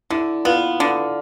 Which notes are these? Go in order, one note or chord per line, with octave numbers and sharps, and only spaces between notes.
D3 E4
B3 F4
D3